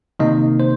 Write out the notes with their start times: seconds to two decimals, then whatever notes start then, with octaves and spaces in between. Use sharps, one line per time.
0.19 C3 D#3 A#3 D#4 D#5
0.60 C5